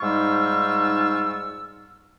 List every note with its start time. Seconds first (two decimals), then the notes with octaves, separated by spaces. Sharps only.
0.01 G#2 G3 D#4 F4 C#6 E6